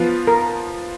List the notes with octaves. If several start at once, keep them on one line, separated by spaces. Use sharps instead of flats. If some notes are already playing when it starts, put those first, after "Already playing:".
Already playing: F3 B3 F4 B4
A#4